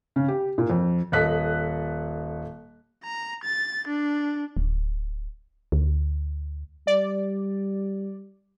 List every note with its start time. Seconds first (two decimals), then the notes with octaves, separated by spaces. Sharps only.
0.16 C#3
0.28 G4
0.58 A#2
0.70 F2
1.12 D#1 A4 D#5 F#6 B6
3.04 A#5
3.43 A6
3.87 D4
4.57 D1
5.72 D2
6.87 G3 D5